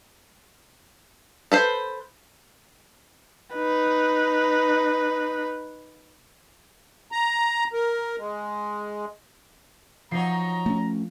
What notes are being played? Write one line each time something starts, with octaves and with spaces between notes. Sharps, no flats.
A4 B4 C5
D#4 B4
A#5
A#4
G#3
F3 F#3 D#4 C#5 A#5 C7
A3 C#4